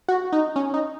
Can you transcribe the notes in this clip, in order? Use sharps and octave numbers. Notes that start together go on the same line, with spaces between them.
F#4
D#4
C#4
D#4